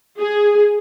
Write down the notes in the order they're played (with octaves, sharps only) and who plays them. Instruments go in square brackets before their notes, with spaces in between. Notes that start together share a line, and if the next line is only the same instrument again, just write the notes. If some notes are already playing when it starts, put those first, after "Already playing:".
[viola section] G#4